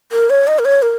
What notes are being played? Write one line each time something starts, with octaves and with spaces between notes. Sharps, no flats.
A#4
C#5
D#5
A#4
C#5
A#4